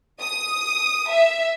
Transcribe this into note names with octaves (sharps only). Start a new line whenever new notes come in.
D#6
E5